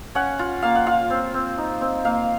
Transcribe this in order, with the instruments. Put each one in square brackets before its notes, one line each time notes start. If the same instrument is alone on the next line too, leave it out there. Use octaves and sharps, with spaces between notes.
[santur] C#4 F#5
F4
A#3 F5
F#5
F4 F5
C4
C4
D#4
C4
A#3 F5